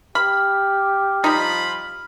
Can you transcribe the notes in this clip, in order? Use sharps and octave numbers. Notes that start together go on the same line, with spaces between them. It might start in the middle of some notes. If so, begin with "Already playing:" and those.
G4 B5 F6
F3 G3 D#4 F4 B5